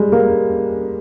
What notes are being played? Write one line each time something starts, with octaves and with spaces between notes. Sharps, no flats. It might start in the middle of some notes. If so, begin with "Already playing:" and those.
Already playing: G3 G#3
A#3